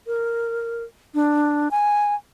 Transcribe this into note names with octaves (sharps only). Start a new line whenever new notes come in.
A#4
D4
G#5